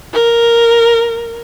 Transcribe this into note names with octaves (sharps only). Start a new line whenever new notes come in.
A#4